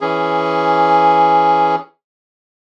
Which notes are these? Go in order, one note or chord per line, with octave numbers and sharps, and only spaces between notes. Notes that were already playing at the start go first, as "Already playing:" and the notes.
E3 C#4 G#4